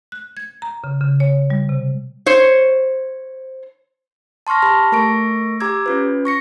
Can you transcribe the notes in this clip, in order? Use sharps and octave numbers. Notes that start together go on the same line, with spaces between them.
F#6
G#6
A#5
C#3
C#3
C#5
G3
C3
C5 C#5
A5 C6 C#6 F6 A#6
G4 A5 B5
A3 A#4 C#6 A#6 D7
G4 A#5 D6 E6 G#6
C#4 F4 B4
C#6 A#6 C#7